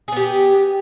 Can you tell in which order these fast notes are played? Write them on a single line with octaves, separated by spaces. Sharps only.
G#4 B3 G4